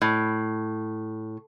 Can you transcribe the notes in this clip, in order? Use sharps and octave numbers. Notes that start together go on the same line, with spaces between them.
A2